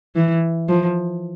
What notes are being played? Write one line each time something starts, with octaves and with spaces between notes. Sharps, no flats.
E3
F3